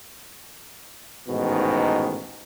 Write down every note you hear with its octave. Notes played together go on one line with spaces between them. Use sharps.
A1 G#2 B2 D#3